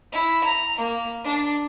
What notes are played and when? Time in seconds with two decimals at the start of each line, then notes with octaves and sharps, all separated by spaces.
0.12 E4
0.44 A#5
0.78 A#3
1.24 D4